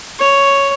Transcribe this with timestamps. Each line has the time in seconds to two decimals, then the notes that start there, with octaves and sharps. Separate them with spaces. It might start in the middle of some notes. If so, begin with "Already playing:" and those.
0.19 C#5